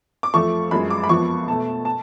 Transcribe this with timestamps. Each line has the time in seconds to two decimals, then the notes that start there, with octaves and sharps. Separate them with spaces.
0.23 D6
0.34 F2 F3 A3 C#6
0.71 F#2 F3 G#3 B5
0.90 D6
1.04 B5
1.09 F2 F3 B3 C#6
1.47 B2 A3 A5
1.85 A5